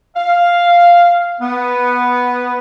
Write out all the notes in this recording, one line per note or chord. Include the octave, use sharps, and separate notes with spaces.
F5
B3